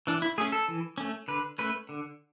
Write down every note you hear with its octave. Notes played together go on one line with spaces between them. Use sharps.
E3 D4
E4
A3 C#4 G#4
A4
E3
A3 C#4
D3 B4
A3 C#4 B4
D3